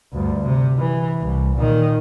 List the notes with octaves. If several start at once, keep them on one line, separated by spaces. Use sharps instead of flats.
D2 G2
C3
E3
C2
A#2 D#3